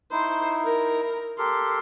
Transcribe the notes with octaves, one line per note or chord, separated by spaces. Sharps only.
D#4 E4 C5
A#4
G4 A4 A#4 C6